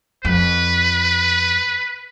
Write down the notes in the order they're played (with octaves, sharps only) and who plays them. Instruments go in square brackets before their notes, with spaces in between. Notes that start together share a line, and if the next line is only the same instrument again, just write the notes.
[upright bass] F2 [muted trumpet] B4